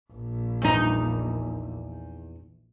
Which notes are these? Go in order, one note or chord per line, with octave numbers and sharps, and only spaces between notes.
A#1
E2 D#4